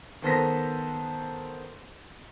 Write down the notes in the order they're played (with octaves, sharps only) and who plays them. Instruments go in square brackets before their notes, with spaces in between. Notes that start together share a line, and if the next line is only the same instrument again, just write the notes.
[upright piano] D#3 B3 A4 C5 A#6 B6